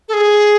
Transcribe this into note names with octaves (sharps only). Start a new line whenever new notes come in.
A4
G#4